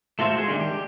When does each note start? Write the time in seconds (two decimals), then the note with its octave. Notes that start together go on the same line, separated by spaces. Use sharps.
0.19 A3 F4 F#4 C5 E5
0.35 G#3 G#4
0.48 D3 D#3 G3 G#3
0.60 G4